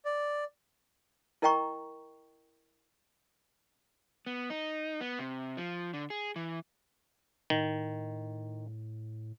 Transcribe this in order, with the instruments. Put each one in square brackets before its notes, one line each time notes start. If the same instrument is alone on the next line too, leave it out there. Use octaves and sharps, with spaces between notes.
[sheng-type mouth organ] D5
[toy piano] E4 A#4 D#5 G5 A#5 C#6
[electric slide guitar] B3
D#4
B3
C3
F3
D3
G#4
E3
[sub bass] A2 [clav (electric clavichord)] D#3